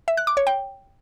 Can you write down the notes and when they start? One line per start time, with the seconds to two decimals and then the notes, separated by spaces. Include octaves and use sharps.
0.08 E5
0.17 F#6
0.27 D6
0.37 C#5
0.47 G5